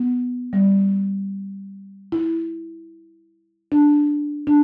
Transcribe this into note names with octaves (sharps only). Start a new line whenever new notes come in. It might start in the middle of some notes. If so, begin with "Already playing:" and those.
Already playing: B3
G3
E4
D4
D4